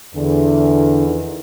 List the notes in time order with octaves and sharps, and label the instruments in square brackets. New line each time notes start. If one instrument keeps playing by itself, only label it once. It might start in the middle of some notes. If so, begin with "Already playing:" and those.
[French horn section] E2 [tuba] D3
[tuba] D#3